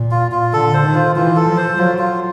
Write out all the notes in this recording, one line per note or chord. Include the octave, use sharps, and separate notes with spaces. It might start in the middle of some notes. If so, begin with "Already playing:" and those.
Already playing: A#2
F4
F4
D3 A4
C5
D#3
F4
E3 F4
A4
F3
C5
F#3 F4
F4